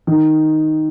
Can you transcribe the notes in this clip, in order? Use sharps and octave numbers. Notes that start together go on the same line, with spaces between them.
D#3